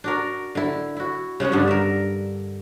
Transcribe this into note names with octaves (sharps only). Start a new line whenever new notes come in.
D4 F#4 A#4
D3 E4
E4 F#4
C#3 G#3 C#4 F#5
G2 D3 B3 D4
A#4 E5